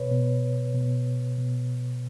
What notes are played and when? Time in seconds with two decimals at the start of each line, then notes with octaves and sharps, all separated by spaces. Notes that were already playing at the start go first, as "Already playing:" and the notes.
Already playing: B2 B4 C#5
0.11 B2
0.74 B2
1.38 B2